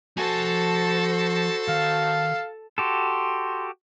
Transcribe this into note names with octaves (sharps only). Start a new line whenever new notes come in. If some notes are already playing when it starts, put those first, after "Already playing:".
F3 F#4 A4 C5 G#5 A5
D#3 F5
F#4 G4 A4 C6